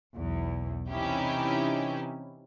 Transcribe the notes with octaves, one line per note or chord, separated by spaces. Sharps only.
B1 E2
C3 E3 C#4 D#4 E4 G4